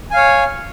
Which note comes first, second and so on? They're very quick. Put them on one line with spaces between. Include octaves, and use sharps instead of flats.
G#5 F5 C#5